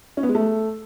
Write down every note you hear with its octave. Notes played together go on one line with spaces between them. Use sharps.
C#4
B3
G#3
A3